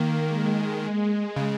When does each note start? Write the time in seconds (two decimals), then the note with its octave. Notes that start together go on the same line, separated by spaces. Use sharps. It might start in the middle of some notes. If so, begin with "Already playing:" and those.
Already playing: D#3 A#3
0.24 G#3
1.36 C#3